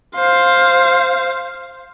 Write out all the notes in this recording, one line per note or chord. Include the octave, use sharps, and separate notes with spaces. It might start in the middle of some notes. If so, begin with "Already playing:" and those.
C5 F5